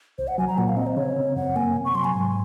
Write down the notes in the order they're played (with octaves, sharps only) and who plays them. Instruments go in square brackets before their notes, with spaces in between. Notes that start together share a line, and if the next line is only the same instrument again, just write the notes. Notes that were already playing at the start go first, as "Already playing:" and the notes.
[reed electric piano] C2 [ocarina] C5
[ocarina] F#5
[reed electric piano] F#3 [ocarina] G#5
[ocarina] A#5
[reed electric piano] A#2 [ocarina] F#5
[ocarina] F5
[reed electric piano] C4 [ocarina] D#5
[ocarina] C5
[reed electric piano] C#3 [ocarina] C#5
[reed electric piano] C4
[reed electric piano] F#2 [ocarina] F#5
[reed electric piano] A#3 [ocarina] G#5
[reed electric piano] C3
[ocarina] C#6
[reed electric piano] F#3 [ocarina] C6
[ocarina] G#5
[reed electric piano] G#2